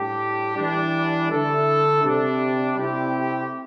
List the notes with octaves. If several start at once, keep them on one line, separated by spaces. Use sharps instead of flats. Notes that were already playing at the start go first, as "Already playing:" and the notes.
Already playing: A2 G3 D4 G4
E3 G3 D4
D3 A3 E4 A4
C3 G3 D4
C3 A3 C4 E4 G4